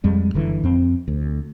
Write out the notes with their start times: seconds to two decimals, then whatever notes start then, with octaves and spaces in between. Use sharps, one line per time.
0.04 F2 G3 G#3
0.34 F#1 D3 E3
0.64 F2 C4
1.08 D2